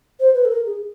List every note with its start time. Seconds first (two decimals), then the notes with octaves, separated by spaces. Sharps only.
0.20 C5
0.34 B4
0.45 A4
0.50 A#4
0.66 G#4